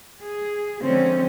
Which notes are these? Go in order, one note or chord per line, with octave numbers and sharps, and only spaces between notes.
G#4
D3 F3 G#3 C4 C#4